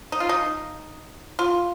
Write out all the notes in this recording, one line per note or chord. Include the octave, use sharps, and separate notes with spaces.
D#4
F4
D#4
F4